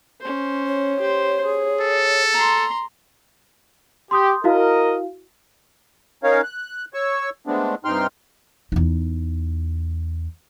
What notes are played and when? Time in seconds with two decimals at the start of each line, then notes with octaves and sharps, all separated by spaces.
0.21 C#4 C5
0.67 C#5
1.00 G4 C5
1.45 G#4
1.80 A4
2.34 A#5 C6
4.11 G4 C6 D#6 G6
4.44 E4 F#4 A#4 D#5 F5
6.24 C#4 D#4 A#4 C#5 F5
6.44 F#6
6.94 C#5 C#6 E6
7.47 G#3 A3 B3 C4 D4
7.85 G2 C3 D#4 G5 C6 F6
8.72 E2 D#4